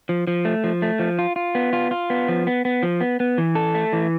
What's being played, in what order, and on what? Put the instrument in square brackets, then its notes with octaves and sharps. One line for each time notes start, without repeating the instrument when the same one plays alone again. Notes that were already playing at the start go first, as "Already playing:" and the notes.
[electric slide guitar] F3
F3
A3
F3
A3
F3
F4
F4
B3
F4
F4
B3
F3
B3
B3
F3
B3
B3
E3
A4
A3
E3